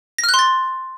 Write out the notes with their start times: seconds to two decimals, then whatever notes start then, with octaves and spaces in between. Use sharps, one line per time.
0.18 A#6
0.24 F6
0.29 F#6
0.34 C6
0.39 A6